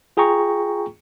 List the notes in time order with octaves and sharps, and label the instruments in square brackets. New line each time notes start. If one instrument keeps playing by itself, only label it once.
[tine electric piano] F4 G#4 G5 A#5 C#6